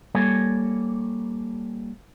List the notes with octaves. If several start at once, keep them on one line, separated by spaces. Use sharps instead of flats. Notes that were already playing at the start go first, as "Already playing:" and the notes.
G3 A#3 A4 C#5 G#5